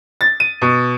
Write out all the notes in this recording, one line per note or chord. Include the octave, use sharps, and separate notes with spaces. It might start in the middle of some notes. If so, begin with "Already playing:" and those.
A6
D#7
B2